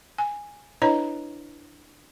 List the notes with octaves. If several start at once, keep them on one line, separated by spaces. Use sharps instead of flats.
G#5
D4 E4 B4 C#5 D#5 A#5